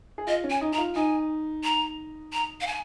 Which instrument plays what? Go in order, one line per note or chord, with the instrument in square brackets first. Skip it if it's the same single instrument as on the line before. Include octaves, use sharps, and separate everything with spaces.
[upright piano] G#4
[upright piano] F4 [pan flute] D#5
[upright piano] C#4
[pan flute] G#5
[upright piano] D#4
[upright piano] D#4 [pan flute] A#5
[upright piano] F4
[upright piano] D#4 [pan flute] G#5
[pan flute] A#5
A#5
F5
G#5